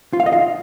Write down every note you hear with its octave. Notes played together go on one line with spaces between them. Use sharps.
F4
F5
D#5
F5